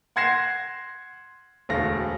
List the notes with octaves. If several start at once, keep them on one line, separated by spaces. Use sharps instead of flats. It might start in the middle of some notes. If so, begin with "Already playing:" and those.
F#5 C6 G#6 A#6 C7 E7
E1 D2 A3 F5 A#6